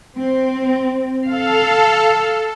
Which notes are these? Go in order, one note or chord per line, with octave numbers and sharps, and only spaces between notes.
C4
A4 F5